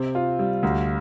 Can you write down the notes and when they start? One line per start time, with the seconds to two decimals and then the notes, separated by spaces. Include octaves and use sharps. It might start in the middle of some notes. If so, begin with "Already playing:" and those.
Already playing: C3 C4
0.15 F4
0.39 G3
0.63 D2